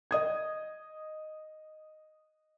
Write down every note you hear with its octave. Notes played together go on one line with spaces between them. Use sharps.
D#5 D#6 G#6